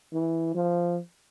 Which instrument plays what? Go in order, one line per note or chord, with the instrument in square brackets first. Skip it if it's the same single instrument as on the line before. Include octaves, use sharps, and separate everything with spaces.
[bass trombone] E3
F3